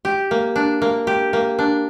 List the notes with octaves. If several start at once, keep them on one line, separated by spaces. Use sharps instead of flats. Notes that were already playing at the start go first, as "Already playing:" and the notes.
G4
A#3
D4
A#3
G4
A#3
D4